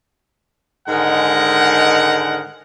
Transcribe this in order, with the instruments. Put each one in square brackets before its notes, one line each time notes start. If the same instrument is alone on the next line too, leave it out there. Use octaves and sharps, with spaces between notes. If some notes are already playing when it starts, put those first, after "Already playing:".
[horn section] G#2 D3 D#3 G#3 A#4 F#5